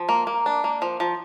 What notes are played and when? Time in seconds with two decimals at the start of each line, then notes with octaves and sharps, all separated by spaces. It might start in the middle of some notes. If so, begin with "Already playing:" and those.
Already playing: F3
0.09 A#3
0.27 A#3
0.46 D4
0.64 A#3
0.82 F3
1.00 F3